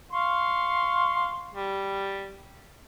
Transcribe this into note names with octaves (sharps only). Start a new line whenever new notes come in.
F5 C6 C#6
G3